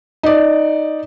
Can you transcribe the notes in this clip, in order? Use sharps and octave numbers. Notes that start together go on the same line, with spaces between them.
D#4 D5